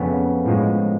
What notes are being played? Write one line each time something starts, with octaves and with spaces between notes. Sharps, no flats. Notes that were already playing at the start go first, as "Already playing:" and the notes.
Already playing: F2 C#3 F3 A3 B3 C#4
A2 F3 G#3